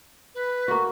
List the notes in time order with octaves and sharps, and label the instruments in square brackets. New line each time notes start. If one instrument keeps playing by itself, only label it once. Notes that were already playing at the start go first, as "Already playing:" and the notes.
[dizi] B4
[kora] A#3 F#4 [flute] C#6